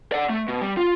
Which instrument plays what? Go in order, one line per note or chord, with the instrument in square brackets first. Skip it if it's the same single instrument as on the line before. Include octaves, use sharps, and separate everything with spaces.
[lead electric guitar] D5 F#5
A3
B2
G3
F4